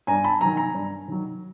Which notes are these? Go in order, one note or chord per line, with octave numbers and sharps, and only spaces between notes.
G2 G#5 A#5
A5 B5
D#3 F#3 G#5 A#5
G#5 A#5
G2
D#3 F#3